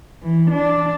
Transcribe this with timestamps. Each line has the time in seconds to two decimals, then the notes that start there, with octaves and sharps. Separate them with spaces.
0.22 E3
0.51 D4